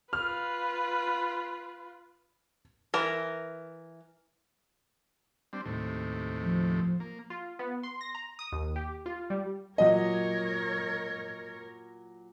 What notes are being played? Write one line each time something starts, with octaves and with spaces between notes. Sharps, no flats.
F4 B4 F6
E3 A#4
G3 C4 D4
D#2 A2 C3
F3
A#3
F4
B3
C6
A#6
A#5
D#6
D#2
G4
F4
G3
A#2 F#3 A#4 C#5 D#5